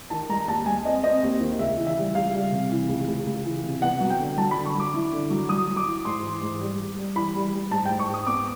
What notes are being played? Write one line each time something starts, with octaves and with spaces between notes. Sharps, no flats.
D#3 A5
G#3 A#5
D#2 A5
G#3 G#5
C4 D#5
C4 D#5
D#2
D#3
C#2 E5
E3
E5
G3
C#2 F5
G3
C3
E3
C#2
C#2
C#2
E3
C3
B3 F#5
F#3
G5
D3
F#3 A5
B5
D3
C#6
F#3
D6
E4
D3
F#3
F#3 D#6
F#3
D6
E4
G#2 C6
E3
G#2
G3
G3
G3
E3 B5
G3
G3
G#2 A5
G5
G#2
C#6
G#2
D#6
B3 D6